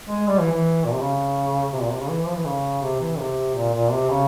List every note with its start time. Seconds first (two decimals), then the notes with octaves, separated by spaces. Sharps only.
0.09 G#3
0.27 G3
0.40 E3
0.52 E3
0.84 A#2
0.92 C3
1.00 C#3
1.73 C3
1.82 A#2
1.91 C3
2.00 C#3
2.09 E3
2.25 F3
2.35 E3
2.45 C#3
2.82 C3
3.01 E3
3.18 C3
3.55 A#2
3.73 A#2
3.92 C3
4.10 C#3